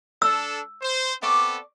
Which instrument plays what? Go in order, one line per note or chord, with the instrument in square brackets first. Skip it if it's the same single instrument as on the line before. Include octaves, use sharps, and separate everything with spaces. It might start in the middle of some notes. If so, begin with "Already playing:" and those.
[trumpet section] D4 A4 [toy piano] E6
[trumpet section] C5
[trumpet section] B3 C4 A4 [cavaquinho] D5 C#6 D6